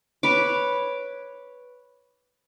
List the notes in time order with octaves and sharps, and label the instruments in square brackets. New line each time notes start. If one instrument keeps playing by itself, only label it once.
[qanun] B4 C#5 D6